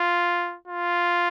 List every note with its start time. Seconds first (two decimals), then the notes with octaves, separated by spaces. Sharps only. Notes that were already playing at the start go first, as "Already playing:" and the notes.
Already playing: F4
0.68 F4